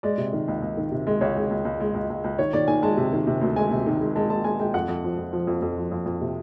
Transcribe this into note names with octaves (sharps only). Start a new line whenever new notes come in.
G#3 D5
C3
D#3
C#2
C#2
D#3
C3
G#3
C#2 C#5
G#3
C#2
C#2
G#3
C#2
C#2
C#2
D#3 C#5
D#3 D5
D#3 G#5
G#3 A5
C3
D#3
C3
D2
G#3 G#5
C3
D#3
G#3
G#3 A5
G#3 A5
G#3 G#5
G#3 G5
F2 F#5
F2
F3
F2
F3
F2
F2
F3
F2
F2
C3